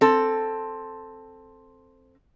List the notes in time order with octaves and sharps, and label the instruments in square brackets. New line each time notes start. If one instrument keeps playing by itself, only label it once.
[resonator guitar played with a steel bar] C4 A4